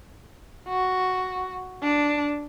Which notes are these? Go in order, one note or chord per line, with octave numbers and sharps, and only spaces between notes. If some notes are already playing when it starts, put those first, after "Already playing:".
F#4
D4